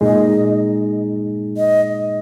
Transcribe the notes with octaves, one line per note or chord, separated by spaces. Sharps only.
A#2 G#3 D#4 G#4 D#5
D#5